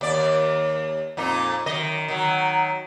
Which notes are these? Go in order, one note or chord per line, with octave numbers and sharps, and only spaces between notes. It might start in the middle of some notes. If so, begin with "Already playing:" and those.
D#2 D5
F2 A#2 D#4
F#2 D#3 D#5
D#3 F#3